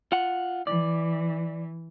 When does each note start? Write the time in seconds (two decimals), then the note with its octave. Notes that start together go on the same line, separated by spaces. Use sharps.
0.12 F4 F#5
0.67 E3 D5